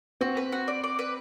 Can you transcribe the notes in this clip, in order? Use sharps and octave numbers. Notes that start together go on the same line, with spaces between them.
C4 F#4
B4
F#4
D5
D5
B4